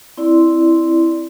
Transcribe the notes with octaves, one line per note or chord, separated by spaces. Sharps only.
C4 E4 D5 C6